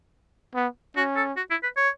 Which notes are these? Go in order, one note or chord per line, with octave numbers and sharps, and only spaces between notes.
B3
C#4 F#4
A4
F#4
E4
B4
C#5